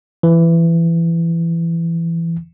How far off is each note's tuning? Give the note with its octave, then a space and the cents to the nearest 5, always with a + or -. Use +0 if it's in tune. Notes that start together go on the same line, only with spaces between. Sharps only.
E3 +20